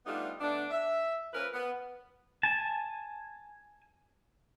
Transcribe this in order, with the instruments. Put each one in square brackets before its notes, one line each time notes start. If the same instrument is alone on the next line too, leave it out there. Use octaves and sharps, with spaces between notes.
[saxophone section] G3 A3 B3 D4 D#4 F4
D3 A3 B3 D4
E5
F3 A#3 C#4 A#4 B4
B3
[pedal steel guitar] G#5 A5